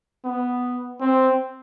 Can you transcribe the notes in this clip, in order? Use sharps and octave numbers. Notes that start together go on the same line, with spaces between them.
B3
C4